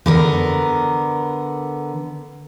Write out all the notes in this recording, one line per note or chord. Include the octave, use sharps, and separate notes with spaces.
D3 B3 A#4